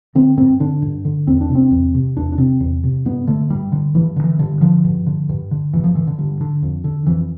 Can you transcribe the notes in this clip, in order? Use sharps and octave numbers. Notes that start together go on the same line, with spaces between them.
D3 C4
G2 C4
D3 D4
G2
D3
E2 C4
D4
C3
C4
E2
C3
E2 D4
D4
C3 C4
E2
C3
G2 B3
D3 A3
G2 G3
D3
G2 E3
D3
E3
G2 D3
D3 F3
G2
D3
G2
D3
G2 E3
F3
D3 E3
D3
G2
D3
F2
D3
F2 E3